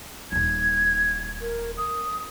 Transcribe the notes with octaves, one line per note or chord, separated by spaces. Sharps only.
D#1 D#4 G#6
A#4
D#6